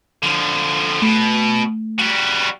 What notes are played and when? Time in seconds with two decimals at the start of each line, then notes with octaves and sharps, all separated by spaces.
0.23 D3 F3
1.02 B2 A3
1.99 G3 F#4